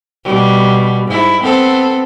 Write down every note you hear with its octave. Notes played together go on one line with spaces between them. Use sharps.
B2 G3
G#2 E4
B3 C4 A4